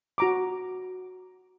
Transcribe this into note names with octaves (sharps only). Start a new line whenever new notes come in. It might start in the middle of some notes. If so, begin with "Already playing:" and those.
F#4 A#5 D6